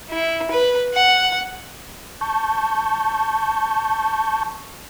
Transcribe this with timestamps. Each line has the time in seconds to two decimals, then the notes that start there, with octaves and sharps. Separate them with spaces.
0.11 E4
0.51 B4
0.94 F#5
2.21 A5 C#6 G6